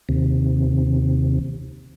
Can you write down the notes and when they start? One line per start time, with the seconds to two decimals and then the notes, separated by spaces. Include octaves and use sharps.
0.09 D#2 C3